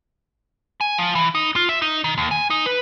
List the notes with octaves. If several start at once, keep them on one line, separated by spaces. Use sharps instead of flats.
G#5
F3
E3
D#4
F4
E5
D#4
D#3
D#2
G#5
D#4
B4